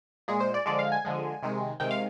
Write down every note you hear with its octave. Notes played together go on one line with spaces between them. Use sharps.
A#2 G#3 G#4
C5
D5
D3 F3 G#3 D5
F5
G#5
D3 F3 G#3
C3 D#3 G#3
C3 D#3 G#3 G5
F5